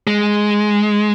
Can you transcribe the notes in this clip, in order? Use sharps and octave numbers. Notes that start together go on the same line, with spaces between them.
G#3